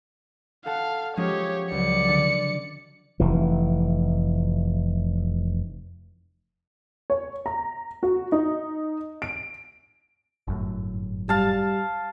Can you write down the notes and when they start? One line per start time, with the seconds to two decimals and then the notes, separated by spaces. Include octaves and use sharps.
0.66 A4 F5 F#5 A5
1.17 F3 G#3 C#4 G4 C#5
1.72 C#2 F#3 D5 C#7
2.08 D3
3.20 F1 E3
7.10 C#5
7.46 A#5
8.03 F#4
8.32 D#4
9.22 D7
10.47 G1 F#2 A2
11.29 G3 F5 A5